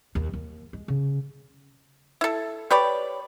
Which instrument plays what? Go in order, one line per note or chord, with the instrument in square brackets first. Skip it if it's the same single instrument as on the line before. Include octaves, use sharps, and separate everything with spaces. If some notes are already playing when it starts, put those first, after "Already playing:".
[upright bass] D#2
D#2
G#3
C#3
[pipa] E4 A4
G4 B4 C#5 D5